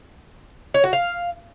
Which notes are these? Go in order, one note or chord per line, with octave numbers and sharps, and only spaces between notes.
C#5
F#4
F5